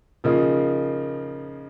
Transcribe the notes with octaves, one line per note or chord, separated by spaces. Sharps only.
C#3 F3 A#3 D#4